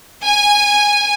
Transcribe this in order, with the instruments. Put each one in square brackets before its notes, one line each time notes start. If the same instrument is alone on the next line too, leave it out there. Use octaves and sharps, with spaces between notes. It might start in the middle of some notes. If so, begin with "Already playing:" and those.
[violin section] G#5